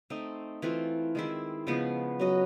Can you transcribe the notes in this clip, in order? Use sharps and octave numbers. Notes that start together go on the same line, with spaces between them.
A3 C4 D#4
E3 A3 C4 F4
D#3 G#3 C4 E4
C#3 F3 G#3 B3
F#3 C#4 F#4 B4 D#5